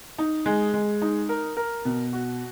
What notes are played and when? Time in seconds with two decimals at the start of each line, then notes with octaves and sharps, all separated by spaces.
0.18 D#4
0.46 G#3
0.74 G#3
1.02 D#4
1.29 A#4
1.57 A#4
1.85 B2
2.13 F#4